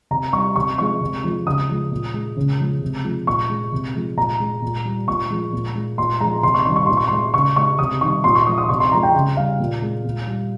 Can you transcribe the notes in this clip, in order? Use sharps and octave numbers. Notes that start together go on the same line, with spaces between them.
C3 A#5
G3 C#6
C3 C#6
F3 G#3 C#6
C3
F3 G#3
C#3 D#6
F3 G#3
A#2
G#3
C#3
F3 G#3
C3
F3 G#3
A#2 C#6
G#3
C3
F3 G#3
A#2 A#5
G#3
A#2
G3
A#2 C#6
F3 G#3
A#2
G#3
A#2 C6
F3 G#3 A#5
C3 C6
C#6
D#3 G3 C6
C#6
A#2 C6
C#6
G#3 C6
C#3 C#6
G#3 C#6
C3 D#6
D#3 G3 C#6
A#2 C6
C#6
F3 G#3 D#6
D#6
C3 C#6
C6
F3 G#3 A#5
G5
C#3
G3 F5
A#2
G#3
A#2
G3